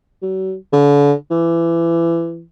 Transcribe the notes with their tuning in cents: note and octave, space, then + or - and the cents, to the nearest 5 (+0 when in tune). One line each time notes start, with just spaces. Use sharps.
F#3 +40
D3 -40
E3 +25